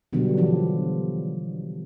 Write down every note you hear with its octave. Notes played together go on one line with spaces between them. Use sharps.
B2 D3 F#3 G3 B3
E3 F3 D4